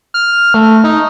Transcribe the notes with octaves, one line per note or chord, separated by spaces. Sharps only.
F6
A3
D#4